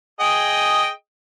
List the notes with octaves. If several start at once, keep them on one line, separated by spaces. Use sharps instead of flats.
G#4 D#5 G5